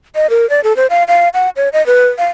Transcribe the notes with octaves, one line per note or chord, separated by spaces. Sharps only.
D#5
A#4
D5
A4
C5
F5
F5
F#5
C#5
D#5
B4
F5